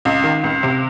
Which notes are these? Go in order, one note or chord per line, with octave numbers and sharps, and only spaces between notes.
C#2
D#3
C#2
C3